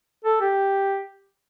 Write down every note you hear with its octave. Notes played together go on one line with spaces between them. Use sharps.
A4
G4